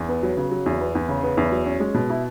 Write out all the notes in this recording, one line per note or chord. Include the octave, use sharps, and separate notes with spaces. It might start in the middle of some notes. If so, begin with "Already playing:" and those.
Already playing: E2
B3
F#3
C#3
F#3
E2
B3
E2
C#3
B3
E2
F#3
C#4
G#3
B2
E4